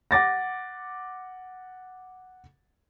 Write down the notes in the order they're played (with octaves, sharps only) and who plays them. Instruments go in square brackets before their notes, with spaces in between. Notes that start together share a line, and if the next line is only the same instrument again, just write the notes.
[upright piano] F#5 D6 A6 A#6